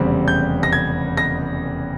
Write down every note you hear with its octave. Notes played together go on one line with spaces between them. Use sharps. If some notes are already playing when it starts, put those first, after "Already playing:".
Already playing: F1 E2 C#3 G3 C4
G6
A#6
G#6
A#6